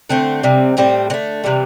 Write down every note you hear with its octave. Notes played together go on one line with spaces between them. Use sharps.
D3 A3 C4
C3 G3
A2 G3 C4
D3 A3 C4
C3 E3 G3